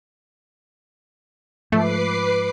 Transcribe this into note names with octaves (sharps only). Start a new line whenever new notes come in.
G#2 F3 A3 B4 D6 C7